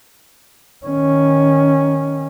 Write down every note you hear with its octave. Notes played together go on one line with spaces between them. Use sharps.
D#3 C#4